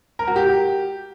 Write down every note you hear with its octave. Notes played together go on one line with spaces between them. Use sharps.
A#4
F#4
G4